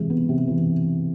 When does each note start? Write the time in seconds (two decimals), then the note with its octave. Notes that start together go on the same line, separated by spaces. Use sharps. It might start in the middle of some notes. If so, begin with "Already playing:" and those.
Already playing: C3 E3 G#3
0.10 B3
0.29 C3
0.47 E3